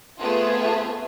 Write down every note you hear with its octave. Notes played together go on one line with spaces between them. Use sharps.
A3 B3 C4 F4 G#4